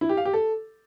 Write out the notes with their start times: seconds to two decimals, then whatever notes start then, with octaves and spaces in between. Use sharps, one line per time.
0.01 E4
0.09 G4
0.17 F5
0.25 G4
0.33 A4